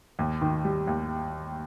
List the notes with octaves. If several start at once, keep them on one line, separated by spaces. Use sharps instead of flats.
D#2
D#3
G3
D#2